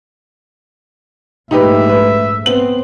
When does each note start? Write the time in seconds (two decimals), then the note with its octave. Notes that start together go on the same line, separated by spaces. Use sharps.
1.51 A#1 G#2 A3 D#4 G4 B4 E5
1.89 B4
2.46 B3 C4 F#7